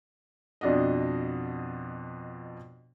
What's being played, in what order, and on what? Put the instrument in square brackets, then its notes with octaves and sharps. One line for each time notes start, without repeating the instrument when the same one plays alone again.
[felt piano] F2 B2 D4 F#4 D#5